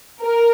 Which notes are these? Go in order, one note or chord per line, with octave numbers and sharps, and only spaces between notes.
A#4